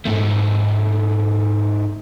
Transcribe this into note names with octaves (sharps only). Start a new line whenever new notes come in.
G#2 A3